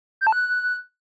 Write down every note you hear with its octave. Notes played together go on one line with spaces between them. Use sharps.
G6
A5
F#6